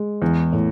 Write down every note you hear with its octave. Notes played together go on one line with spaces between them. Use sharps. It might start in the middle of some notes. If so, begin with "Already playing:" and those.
Already playing: G#3
E2 E3
A2